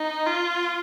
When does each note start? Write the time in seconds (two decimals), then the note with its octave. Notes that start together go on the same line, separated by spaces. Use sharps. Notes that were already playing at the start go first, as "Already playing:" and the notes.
Already playing: D#4
0.26 F4